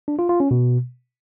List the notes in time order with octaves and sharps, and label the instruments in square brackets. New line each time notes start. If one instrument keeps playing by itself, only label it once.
[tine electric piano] D4
F4
F4
C#4
B2